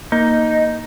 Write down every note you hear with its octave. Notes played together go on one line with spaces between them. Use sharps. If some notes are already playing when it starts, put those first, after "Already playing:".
A#3 D#4